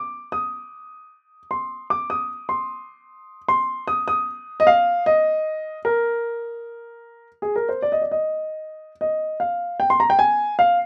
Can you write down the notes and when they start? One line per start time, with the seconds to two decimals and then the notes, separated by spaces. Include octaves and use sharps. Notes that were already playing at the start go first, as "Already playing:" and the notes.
Already playing: D6
0.32 D#6
1.51 C6
1.90 D6
2.10 D#6
2.49 C6
3.48 C6
3.88 D#6
4.08 D#6
4.60 D#5
4.67 F5
5.06 D#5
5.85 A#4
7.42 G#4
7.56 A#4
7.69 C5
7.82 D5
7.92 D#5
8.01 D5
8.11 D#5
9.01 D#5
9.40 F5
9.80 G5
9.90 C6
10.00 A#5
10.10 G5
10.19 G#5
10.59 F5